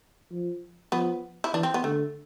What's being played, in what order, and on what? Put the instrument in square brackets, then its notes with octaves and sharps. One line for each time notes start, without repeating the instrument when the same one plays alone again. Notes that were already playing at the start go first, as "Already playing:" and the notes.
[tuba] F3
[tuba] F3 [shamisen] B3
[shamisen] E4
[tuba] E3 [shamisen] D4
[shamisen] C4
B3
[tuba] D3 [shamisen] A3